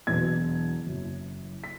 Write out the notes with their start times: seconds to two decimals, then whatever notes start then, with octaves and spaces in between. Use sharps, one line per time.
0.07 E1 E2 B2 F#3 G#6
0.85 F#1 F#2 C#3 E3
1.64 B6